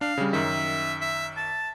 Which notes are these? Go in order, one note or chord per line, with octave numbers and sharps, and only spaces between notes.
D4 F5
C#3 G3
F#2 D#3 E5
E5
A5